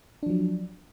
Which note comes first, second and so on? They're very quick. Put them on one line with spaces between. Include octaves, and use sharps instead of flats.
D4 F3 F#3